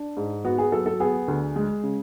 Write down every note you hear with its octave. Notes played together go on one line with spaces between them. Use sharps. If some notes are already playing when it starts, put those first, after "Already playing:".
Already playing: D4
G#2
B3 F#4
G#4
F#3 A4
A4
B3 G#4
D2
G#3
C#3